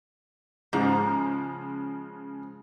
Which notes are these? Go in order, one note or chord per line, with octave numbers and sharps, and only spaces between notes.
G#2 C#3 F3 G#3